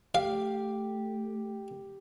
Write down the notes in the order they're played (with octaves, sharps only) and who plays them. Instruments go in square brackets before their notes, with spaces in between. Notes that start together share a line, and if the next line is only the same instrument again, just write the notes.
[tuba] A3 [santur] G4 [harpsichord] F5